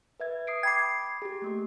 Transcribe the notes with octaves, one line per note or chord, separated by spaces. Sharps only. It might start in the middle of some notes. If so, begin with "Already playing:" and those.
B4 E5 G#6
D#6 C7 D7
G5 B5 D6 G#6 C7
G4 G#4
A3 A#3 G4